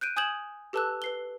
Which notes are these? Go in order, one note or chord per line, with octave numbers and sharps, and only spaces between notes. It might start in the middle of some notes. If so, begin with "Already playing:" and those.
F#6 G6 D7 D#7
G#5 D#6 G6 G#6 E7 F#7
G4 A4 B4 A5 E6 F#6
B4 C7 G7